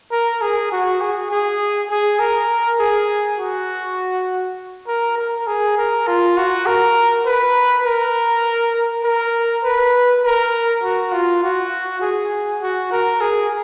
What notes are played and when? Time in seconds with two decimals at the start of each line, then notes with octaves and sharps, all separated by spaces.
0.11 A#4
0.41 G#4
0.72 F#4
1.01 G#4
1.31 G#4
1.90 G#4
2.19 A#4
2.79 G#4
3.39 F#4
4.87 A#4
5.18 A#4
5.47 G#4
5.77 A#4
6.07 F4
6.37 F#4
6.67 A#4
7.26 B4
7.85 A#4
9.04 A#4
9.64 B4
10.24 A#4
10.83 F#4
11.12 F4
11.43 F#4
12.01 G#4
12.61 F#4
12.92 A#4
13.21 G#4